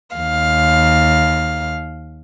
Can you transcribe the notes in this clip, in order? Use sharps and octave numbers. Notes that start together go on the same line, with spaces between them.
D#2 F5